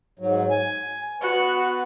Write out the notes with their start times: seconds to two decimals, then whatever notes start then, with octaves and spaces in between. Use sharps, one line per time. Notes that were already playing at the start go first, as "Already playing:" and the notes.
0.19 G#2 F#3
0.50 G#5
1.21 B3 F#4 B4